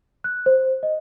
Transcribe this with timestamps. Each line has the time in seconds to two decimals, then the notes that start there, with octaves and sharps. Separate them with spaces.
0.24 F#6
0.46 C5
0.83 D#5